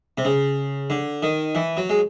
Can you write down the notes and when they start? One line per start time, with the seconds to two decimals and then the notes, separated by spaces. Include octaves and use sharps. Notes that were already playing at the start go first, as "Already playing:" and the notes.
0.18 C3
0.25 C#3
0.90 D3
1.23 D#3
1.55 E3
1.77 F#3
1.89 G#3